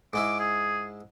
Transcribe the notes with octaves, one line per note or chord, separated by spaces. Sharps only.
G#2 G#3 E4 D6
G#4